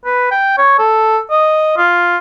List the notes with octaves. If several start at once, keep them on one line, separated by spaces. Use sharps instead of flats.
B4
G5
C#5
A4
D#5
F4